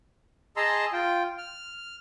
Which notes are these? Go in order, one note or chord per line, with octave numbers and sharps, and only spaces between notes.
G#4 D#5 A5 A#5 C6 E6
F4 G5
F6